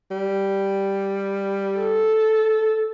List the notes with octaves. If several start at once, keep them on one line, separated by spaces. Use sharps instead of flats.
G3
A4